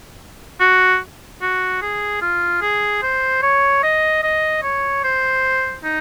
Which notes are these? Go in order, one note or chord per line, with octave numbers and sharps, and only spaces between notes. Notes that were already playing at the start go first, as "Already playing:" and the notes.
F#4
F#4
G#4
F4
G#4
C5
C#5
D#5
D#5
C#5
C5
D#4